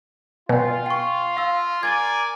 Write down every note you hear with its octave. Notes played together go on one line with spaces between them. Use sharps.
B2 F4 G5 G#5
G5 C#6
F5 E6
A#4 D5 G#5 G#6 A6 D#7